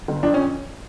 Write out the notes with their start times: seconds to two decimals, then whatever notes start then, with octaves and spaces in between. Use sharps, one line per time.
0.08 G1
0.23 F2 D4
0.34 C#4